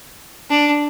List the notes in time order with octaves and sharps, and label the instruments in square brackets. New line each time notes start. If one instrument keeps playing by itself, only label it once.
[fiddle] D4